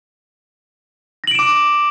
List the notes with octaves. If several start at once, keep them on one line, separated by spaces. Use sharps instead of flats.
D6 A#6 D7 E7 F#7